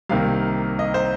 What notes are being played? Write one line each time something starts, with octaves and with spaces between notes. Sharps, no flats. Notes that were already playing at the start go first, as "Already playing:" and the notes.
C2 C3 D#3 A#3 F5
D#5
C5